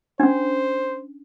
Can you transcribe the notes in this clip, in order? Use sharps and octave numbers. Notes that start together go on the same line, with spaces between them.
C#4 D4 C5